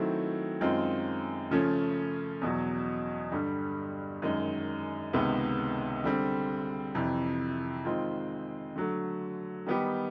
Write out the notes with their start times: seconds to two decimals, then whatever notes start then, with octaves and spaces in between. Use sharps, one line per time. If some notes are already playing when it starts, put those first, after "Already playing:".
Already playing: D#3 F#3 A3 C4 E4
0.61 F#2 D#3 G#3 C4 F4
1.51 C#3 F3 A3 C#4
2.41 E2 B2 F#3
3.32 G2 D3 G3
4.22 F#2 D#3 G#3
5.13 C#2 C3 D#3 G#3 B3
6.04 D3 G3 C4
6.95 F2 C3 E3
7.85 D#3 G#3 C4 F4
8.76 D3 F#3 A3
9.67 D#3 G3 B3 D#4 G4